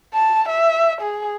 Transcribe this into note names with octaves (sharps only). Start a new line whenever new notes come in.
A5
E5
G#4